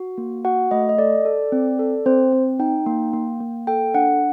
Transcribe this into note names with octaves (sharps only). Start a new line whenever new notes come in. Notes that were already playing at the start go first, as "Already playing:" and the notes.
Already playing: F#4
A#3
F#4 F#5
A3 D#5
D#5
A4 D5
A4
C4
A4
C4 C5
C4
D#4 G5
A#3
A#3
A#3
A4 G5
D4 F#5